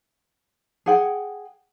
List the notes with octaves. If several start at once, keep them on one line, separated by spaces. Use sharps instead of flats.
G#4 F#5 G5